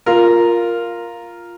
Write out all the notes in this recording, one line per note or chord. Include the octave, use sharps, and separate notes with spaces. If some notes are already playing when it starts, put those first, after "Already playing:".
F4 A#4